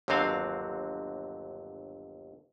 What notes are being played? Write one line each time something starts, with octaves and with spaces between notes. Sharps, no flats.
G1 D#2 D3 F#3 C4 F5